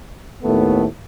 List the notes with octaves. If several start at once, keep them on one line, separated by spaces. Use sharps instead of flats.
D#2 A2 A3 B3